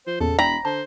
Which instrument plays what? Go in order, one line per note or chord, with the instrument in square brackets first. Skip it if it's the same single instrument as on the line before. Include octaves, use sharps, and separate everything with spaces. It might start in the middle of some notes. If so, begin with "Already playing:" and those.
[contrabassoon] F3 [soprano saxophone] C5
[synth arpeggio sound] E2 A#2 [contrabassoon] C#3 [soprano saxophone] A4
[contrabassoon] E1 [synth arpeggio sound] D5 E5 G5 [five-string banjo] A#5 [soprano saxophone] B5
[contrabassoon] D3 [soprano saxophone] C5 [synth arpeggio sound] A5